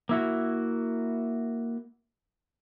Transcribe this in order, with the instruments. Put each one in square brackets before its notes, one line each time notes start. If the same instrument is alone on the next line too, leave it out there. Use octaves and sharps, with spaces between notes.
[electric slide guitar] A#3 E4 F#4